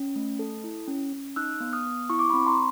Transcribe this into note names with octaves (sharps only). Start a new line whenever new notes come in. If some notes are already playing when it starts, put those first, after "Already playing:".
Already playing: C#4
A3
A4
E4
C#4
C#4
D#4 E6 F#6
B3
D#6 F6
B3
E4 C#6
D6
C4 B5 C#6
A#5 C6